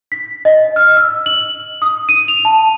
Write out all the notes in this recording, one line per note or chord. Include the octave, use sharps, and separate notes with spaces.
B6
D#5
F6
E6
F#7
D#6
D#7
F7
A5